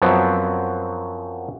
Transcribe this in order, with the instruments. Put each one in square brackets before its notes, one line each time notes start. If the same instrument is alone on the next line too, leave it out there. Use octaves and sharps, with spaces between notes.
[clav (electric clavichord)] F#2 F3 F#3 B3 C4